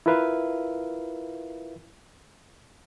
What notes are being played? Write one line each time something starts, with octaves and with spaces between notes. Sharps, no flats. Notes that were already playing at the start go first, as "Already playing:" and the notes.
E4 F4 A#4 B4 E5 F5